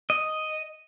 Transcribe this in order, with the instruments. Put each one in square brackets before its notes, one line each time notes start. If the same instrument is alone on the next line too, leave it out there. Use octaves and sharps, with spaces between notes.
[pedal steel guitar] D#5